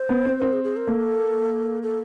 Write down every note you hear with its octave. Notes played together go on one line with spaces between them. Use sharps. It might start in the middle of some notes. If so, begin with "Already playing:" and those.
Already playing: C5
B3
C4
C4 A#4
G#4
G#4
A#4
A#3 A4
A4